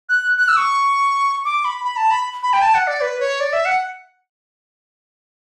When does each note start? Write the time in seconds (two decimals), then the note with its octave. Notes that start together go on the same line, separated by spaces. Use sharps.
0.09 F#6
0.38 F#6
0.48 E6
0.58 C#6
1.45 D6
1.65 B5
1.84 B5
1.97 A5
2.11 B5
2.43 B5
2.53 G5
2.62 A5
2.74 F#5
2.87 D5
3.01 B4
3.20 C#5
3.40 D5
3.53 E5
3.65 F#5